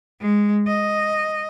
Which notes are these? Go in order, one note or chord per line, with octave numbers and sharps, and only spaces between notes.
G#3
D#5